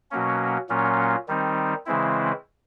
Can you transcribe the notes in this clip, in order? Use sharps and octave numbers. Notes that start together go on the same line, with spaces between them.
B2 F#3 A#3 C#4
A#2 F#3 A#3 C#4 F4
D#3 G3 C4 D#4
C#3 E3 G#3 C4 E4